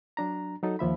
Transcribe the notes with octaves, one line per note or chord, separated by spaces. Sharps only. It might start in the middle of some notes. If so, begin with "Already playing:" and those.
F#3 D4 A#5
F#3 D#4 A4
D#2 F3 E5 B5